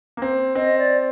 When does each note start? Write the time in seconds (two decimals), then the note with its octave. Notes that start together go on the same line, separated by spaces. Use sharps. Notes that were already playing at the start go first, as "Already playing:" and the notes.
0.17 A#3
0.22 C4
0.55 C4 D#5
0.78 D5